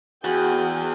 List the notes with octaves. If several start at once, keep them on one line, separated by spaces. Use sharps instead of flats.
E2 F#4 G#4 G5